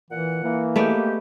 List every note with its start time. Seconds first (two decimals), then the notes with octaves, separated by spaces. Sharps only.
0.11 A#2 E3 F#5
0.44 E3 A#3
0.76 G#3 A3 B3 G4 D5